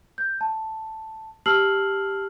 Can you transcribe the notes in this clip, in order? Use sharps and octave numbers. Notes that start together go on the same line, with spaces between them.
G6
A5
G4 A5 E6 F6 C7 F#7